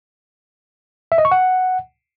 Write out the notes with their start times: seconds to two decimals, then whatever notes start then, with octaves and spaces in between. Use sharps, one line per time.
1.12 E5
1.18 D#5
1.25 C#6
1.32 F#5